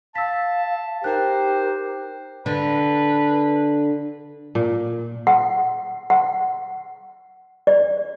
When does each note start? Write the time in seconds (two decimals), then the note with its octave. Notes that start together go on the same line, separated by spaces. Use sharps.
0.15 F5 A5 E6 B6
1.04 D#4 G4 A#4 C5 F#6
2.46 D3 B4
4.55 A#2
5.27 F#5
6.10 F#5
7.67 D5